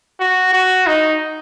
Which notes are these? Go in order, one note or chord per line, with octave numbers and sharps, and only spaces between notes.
F#4
F#4
D#4